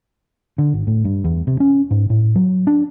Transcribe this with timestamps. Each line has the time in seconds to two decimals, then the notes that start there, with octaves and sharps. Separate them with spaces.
0.58 D3
0.73 G#1
0.87 A2
1.05 G2
1.24 E2
1.47 C3
1.60 C#4
1.91 G#2
2.10 A2
2.36 F#3
2.67 D4